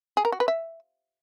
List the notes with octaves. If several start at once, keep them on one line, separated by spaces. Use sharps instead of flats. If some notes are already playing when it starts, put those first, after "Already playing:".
G#4
A#4
F#4
B4
E5